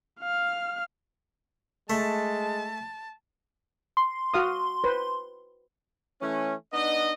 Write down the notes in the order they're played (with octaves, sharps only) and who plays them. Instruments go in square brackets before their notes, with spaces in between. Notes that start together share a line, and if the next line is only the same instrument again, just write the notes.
[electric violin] F5 F6
[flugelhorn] G#3 [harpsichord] A3 [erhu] A5
[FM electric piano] C6
[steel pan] F#4 F5 D#6
B4 C5
[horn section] E3 A3 C#4
B3 D4 D#4 D#5